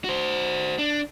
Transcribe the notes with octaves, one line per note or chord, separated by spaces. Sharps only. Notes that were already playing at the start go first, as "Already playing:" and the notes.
F#4 C5
D4